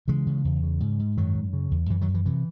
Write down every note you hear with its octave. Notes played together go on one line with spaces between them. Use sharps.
C#3 E3 G#3
C#3
E2
C#3
G#2
G#2
F#2 D#3 F#3
F#2
C#3
E2
F#2 E3
D#3 F#3
F#2
E3
C3 E3